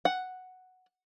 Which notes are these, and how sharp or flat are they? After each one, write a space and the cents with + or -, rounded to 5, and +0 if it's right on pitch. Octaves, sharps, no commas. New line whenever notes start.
F#5 +0